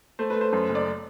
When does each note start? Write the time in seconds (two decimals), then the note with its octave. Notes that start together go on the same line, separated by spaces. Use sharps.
0.19 A3 C5
0.30 B4
0.35 A3
0.41 C5
0.52 F#2 C5
0.69 F#1
0.75 D5